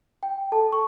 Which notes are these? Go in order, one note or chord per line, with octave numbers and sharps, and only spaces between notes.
G5
A4 A5
C#6